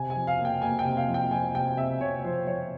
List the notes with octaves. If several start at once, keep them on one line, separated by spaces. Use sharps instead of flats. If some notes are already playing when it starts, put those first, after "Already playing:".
Already playing: C3 G#5
G#5
F3
F5
A#3
G5
A#3 G#5
G5
C3
F5
F3
G5
F3 G#5
C3 G5
C3 E5
C3 C#5
F3 C5
F3 C#5